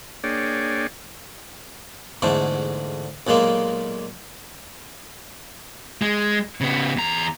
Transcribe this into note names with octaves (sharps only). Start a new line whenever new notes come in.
A#3 D4 G#4 C#5 D5 G5
E2 G#2 D3 A3
B1 A#2 G#3 A#3
G#3
C#3 B3
E2 A#5